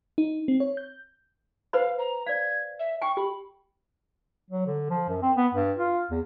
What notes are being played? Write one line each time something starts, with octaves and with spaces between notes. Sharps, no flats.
D#4
C4
C#5
G6
B4 C5 F5 B5
A#5
D5 F5 G#6
E5
G5 G#5 C#6
G4 B5
F#3
D3
F3
F#2
C4
B3
G2
F4
E2